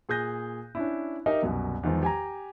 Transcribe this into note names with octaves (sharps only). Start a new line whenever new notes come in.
A#2 G#4 D#6 G6 A#6
C#4 D4 E4
D#4 G4 A#4 D#5 E5
C2 F#2 B2
E2 D#3 F3 G#3
G4 G#5 A#5